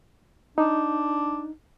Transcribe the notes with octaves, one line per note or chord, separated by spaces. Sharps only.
D4 D#4